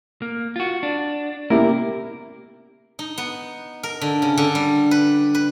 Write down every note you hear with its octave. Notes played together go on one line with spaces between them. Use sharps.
A#3
F4 F#4
D4
A#3 E4 G4 A#4
D#4
B3
A#4
D3
C#3
D3
G3
B4
B4